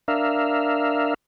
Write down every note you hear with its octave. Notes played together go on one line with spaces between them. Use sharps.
D4 A#4 E5 F5